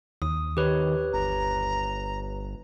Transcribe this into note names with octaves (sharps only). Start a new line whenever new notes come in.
D#2 D#6
D#3 G4 B4 C#5
G1 A#5